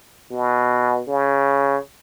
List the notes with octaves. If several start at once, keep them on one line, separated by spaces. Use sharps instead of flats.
B2
C#3